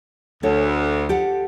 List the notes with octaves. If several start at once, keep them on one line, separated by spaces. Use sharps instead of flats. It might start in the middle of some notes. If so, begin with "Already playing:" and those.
D2 A4 C#5
G4 A4 F#5